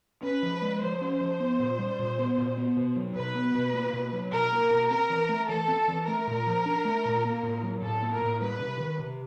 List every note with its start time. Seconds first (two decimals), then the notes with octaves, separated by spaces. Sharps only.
0.23 C#4 B4
0.43 F3
0.62 G#3
0.82 F3 C5
1.01 C#4
1.21 F3
1.40 B3
1.59 A#2
1.79 G3
1.99 A#2
2.19 B3
2.38 A#2
2.57 B3
2.77 B2
2.96 F#3
3.15 B2 B4
3.35 B3
3.55 B2
3.74 A#3
3.93 B2
4.12 F#3
4.32 B2 A#4
4.52 A#3
4.71 B2
4.91 C4 A#4
5.10 E3
5.29 A3
5.49 E3 A4
5.68 C4
5.88 E3
6.07 A3 A#4
6.27 A#2
6.47 F3
6.66 D4
6.85 A3
7.05 A#2
7.25 A#3
7.43 A2
7.63 F#3
7.82 A2 A4
8.02 A#3
8.12 A#4
8.22 A2
8.41 G3 B4
8.60 C3
8.80 D#3
8.99 C3